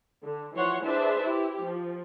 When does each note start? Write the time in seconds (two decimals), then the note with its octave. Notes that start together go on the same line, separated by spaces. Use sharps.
0.23 D3
0.54 E3 F3 F#4 C#5 F#5 C6
0.84 D4 G#4 B4 C5 E5 A5
1.22 E4 G4
1.64 F3